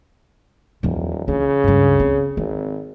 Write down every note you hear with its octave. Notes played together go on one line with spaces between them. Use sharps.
D#1 E2 F3
C#3 E4 F4
C#2 G2
C4
G#1 C4